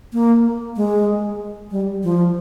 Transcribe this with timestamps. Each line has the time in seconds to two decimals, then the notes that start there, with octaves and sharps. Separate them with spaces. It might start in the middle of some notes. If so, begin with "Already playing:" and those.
0.13 A#3
0.76 G#3
1.71 G3
2.03 F3